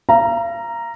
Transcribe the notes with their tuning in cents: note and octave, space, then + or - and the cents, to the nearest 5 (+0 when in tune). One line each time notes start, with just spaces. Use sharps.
F5 -40 A#5 +0